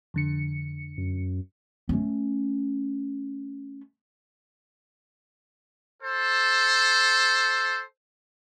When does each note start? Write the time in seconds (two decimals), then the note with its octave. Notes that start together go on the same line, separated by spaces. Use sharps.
0.14 F2 D3 C#7
0.98 F#2
1.89 A3 C#4
6.02 A4 C5